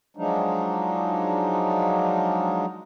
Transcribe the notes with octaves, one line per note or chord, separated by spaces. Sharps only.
F3 F#3 G#3 D4 D#4